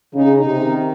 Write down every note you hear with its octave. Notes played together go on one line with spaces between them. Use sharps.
C#3 D#4
D#4
C3
D#3